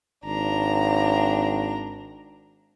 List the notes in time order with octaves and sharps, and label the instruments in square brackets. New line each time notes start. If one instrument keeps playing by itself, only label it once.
[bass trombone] G#1 [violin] D4 A#5